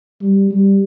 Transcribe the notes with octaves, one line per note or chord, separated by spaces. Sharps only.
G3
G3